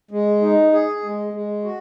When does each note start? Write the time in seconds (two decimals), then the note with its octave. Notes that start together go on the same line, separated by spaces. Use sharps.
0.11 G#3
0.41 D#4
0.72 G#4
1.03 G#3
1.33 G#3
1.64 F#4